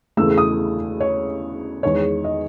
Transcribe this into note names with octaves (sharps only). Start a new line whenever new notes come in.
E2 C#3 E3 A3 E6
D#6
C#5
E2 D#3 G#3 C#5
D#5